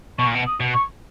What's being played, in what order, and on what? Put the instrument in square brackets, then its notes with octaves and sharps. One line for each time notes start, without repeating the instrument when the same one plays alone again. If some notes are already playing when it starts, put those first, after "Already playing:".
[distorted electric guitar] B2 [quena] C#6
[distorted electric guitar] A#2
B2
[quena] D#6
[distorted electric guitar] B2
[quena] C#6